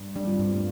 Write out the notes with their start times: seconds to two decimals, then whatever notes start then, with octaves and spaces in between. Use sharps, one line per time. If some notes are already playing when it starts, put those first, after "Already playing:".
Already playing: G2
0.16 G3 D4
0.27 C4 F4
0.39 G2
0.52 A3